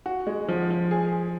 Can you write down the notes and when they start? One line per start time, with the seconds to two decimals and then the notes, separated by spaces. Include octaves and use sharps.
0.06 F#4
0.27 G#3
0.49 F3
0.70 F3
0.91 G#4
1.12 G#4